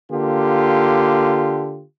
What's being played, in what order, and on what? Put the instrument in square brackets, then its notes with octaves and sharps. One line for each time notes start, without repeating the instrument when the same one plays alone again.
[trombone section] D3 A#3 F4 G4